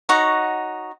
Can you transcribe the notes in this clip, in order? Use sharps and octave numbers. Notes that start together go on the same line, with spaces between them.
D#4 F#4 C#5 F#5